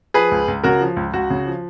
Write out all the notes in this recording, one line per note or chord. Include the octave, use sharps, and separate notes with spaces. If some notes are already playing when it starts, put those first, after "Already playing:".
F3 G#4 B4
C#2
C#2
C#3 F#4 A#4
F3
C#2
C#2 F#4
C#3
F3